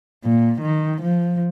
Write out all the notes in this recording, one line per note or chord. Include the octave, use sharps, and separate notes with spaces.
A#2
D#3
F3